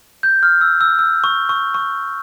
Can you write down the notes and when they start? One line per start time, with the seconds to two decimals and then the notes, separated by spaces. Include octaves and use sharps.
0.23 G6
0.43 F6
0.61 E6
0.81 E6
0.99 E6
1.24 C#6
1.49 C#6
1.75 C#6